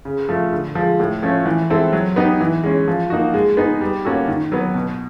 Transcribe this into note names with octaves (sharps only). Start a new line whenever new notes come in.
C#3
F3 A3
D3
F3 G#3
A2
F3 A3 C#4
E3
G#3 C4 E4 A4
F#3
B3 D#4 G4
E3
G#3 C#4
F3
A#3 D#4 F#4
G#3
B3 D#4 G#4
G3
A#3 C#4 F#4 A4
D#3
F#3 B3
B2